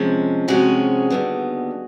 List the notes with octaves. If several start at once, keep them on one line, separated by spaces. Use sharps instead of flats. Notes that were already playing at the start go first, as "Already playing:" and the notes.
Already playing: C3 F3 G#3 C#4
C3 F3 G#3 C#4 F#4 G#4
D#2 D3 G3 B3